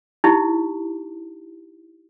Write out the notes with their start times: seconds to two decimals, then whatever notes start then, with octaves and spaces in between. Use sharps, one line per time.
0.24 D#4 E4 G4